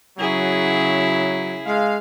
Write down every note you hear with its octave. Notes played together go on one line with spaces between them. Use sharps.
C#3 F#3 E4 G#4
G#3 F5